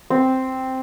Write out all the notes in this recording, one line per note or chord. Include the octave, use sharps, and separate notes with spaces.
C4